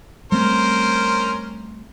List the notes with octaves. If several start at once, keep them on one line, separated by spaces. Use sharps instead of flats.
G3 A3 C4 C#4 A#4 C5